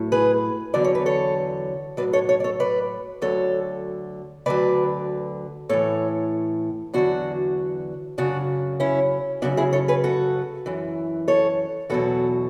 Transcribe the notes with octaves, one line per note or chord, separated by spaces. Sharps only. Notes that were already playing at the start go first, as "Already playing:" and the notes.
Already playing: A2 F#3
G#4 B4
E2 D3 F#3 D5
C#5
B4
A4 C#5
A2 F#3 B4 D5
A4 C#5
A4 C#5
D5
A4 C#5
B4 D5
D2 D3 F#3 A4 C#5
D2 D3 F#3 B4 D5
A2 E3 A4 C#5
E2 D3 F#3 D4 F#4
F#2 C#3 F#3 D4 F#4
C#4 E4
F#2 C#3 F#3 D4 F#4
E4 G#4
A4 C#5
G#4 B4
F#4 A4
F#2 E3
A4 C#5
E2 B2 F#3 F#4 A4